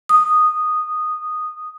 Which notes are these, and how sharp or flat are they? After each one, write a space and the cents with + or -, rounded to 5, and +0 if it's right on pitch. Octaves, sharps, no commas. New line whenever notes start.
D#6 -10